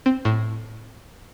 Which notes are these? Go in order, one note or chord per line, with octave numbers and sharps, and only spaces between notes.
C4
A2